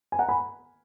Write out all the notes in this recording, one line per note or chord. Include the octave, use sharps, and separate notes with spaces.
G#5
F#5 A#5
G#5 B5